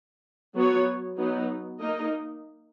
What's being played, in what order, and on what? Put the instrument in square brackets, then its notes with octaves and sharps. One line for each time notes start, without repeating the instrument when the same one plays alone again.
[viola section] F#3 B3 F#4 C#5
F#3 B3 D#4
A#3 D#4 A#4 D#5